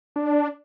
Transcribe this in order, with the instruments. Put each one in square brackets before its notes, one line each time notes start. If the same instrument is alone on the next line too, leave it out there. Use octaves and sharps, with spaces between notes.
[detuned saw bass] D4